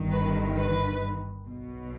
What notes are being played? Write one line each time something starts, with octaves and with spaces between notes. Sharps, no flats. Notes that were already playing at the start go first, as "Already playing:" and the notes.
Already playing: G1 G2 D#3
B4
B4
B1 B2